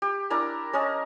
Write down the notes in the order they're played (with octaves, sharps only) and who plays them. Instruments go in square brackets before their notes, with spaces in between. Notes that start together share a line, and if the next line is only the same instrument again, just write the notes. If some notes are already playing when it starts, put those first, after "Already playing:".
[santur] G4
D4 E4 A#4 A#5
C#4 A#4 D#5 A5